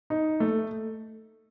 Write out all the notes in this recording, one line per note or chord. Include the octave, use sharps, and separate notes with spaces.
D#4
A3